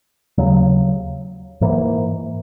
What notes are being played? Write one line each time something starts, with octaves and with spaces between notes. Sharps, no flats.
D#2 C#3 F#3
G#2 E3 A#3